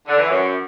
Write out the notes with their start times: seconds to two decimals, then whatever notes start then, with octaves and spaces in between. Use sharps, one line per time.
0.07 D3
0.18 E3
0.29 F#2